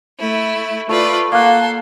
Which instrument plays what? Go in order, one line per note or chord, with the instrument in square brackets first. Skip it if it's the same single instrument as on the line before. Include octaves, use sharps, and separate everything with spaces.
[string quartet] A3 E4
[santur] A3 [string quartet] F4 B4 D5
[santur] A#3 F#5 [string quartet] A4 C6